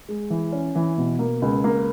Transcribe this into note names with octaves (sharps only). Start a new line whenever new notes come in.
G#3
E3
C#4
E3
B2
A#3
C#2
A#3